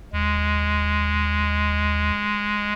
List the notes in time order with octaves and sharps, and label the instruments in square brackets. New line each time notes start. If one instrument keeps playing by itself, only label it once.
[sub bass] D#2 [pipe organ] G#3